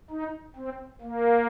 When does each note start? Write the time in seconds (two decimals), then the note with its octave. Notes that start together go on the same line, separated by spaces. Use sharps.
0.10 D#4
0.56 C4
1.01 A#3